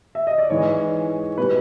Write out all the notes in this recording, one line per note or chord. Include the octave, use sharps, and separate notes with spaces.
E5
D#5
D5
G#2 E3 G#3 C#5
B2 G3 B4